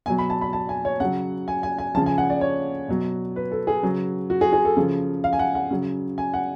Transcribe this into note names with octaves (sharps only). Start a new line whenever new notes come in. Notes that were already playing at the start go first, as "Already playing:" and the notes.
B2 F#3 G#5
B5
A5
B5
A5
G#5
C#5
C#3 F#3 F#5
G#5
G#5
G#5
C#3 F3 A5
G#5
F#5
D5
C#5
B2 F#3
B4
A4
G#4
C#3 F#3
F#4
G#4
G#4
A4
C#3 F3
F5
G#5
F#5
F#5
C#3 F#3
G#5
F#5